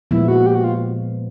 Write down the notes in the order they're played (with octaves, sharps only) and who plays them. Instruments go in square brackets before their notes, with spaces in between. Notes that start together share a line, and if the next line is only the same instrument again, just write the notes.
[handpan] A#2 F3 G#3 B3 [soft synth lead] E4
[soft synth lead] F#4
G4
F#4
F4